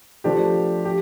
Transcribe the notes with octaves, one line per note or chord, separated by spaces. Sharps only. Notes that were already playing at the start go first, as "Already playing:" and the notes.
F3 A3 D4 G4
G4